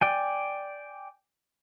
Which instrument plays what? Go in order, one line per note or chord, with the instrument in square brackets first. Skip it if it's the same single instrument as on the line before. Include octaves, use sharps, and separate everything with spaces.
[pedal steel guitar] D5 G5 G#5